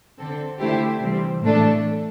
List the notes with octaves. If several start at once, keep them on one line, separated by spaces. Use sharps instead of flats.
D3 C4 A4
D3 A3 E4 G4 C5
C3 E3 G3 C4
A2 E3 A3 D4 A4